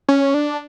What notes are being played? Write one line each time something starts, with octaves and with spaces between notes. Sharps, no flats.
C#4
D4